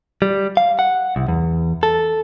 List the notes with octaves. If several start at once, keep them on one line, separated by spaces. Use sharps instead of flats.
G3
F5
F#5
C2
E2
A4